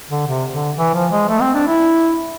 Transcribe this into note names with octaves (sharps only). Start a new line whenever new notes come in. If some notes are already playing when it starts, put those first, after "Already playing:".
D3
C3
D3
E3
F3
G#3
A3
C4
D4
E4